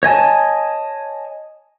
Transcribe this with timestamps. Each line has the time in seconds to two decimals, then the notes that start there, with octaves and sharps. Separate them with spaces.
0.03 C#5 D#5 G#5 A5